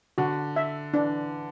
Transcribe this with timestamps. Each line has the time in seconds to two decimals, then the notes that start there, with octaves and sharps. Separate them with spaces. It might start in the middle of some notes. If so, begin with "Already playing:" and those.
0.18 D3 F#4
0.56 E5
0.94 E3 D4